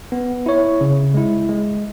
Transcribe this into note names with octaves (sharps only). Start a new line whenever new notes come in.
B3
E4 C#5
C#3
G#3 E4
G#3